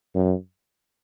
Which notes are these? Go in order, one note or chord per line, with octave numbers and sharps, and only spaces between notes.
F#2